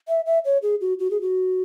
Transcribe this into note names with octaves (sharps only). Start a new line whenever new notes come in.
E5
E5
C#5
G#4
F#4
F#4
G#4
F#4